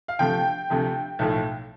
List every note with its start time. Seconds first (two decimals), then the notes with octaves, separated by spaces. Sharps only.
0.08 F5
0.19 D2 C3 F3 A3 G5
0.70 D2 C3 F3 A3
1.19 B1 A2 F3 A3